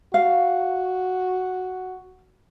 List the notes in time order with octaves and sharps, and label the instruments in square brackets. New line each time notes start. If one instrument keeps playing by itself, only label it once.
[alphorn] F#4 [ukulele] F5